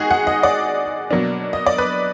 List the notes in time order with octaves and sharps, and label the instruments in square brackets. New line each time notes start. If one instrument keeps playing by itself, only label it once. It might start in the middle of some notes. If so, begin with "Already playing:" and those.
Already playing: [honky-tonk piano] D#3 G#3 D#4 F#4 G#4
F#5
D#5
D5
B2 F#3 A#3 D4
D#5
D5
B4